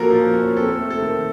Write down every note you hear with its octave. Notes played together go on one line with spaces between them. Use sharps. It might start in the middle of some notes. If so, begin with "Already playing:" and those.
Already playing: F3 A#3 C#4 F4 F#4 A4 A#4
F3
C#4
C4 A4
A3
A4
D#3